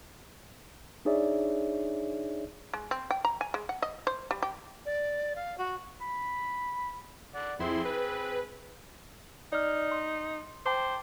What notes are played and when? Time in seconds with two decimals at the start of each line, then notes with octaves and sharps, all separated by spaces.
1.05 D4 D#4 G#4 C#5 D5 E5
2.73 G#3
2.91 C4
3.11 G5
3.25 A#5
3.41 G#5
3.54 G#3
3.69 F#5
3.82 D#5
4.07 C5
4.31 G3
4.42 G4
4.85 D5
5.35 F5
5.58 F#4
6.01 B5
7.36 D5 F#5
7.59 F2 C4 E4 G#4 C6
7.85 B4
9.53 D#4 D5 F6
9.92 C6
10.66 C5 G5 A5 D6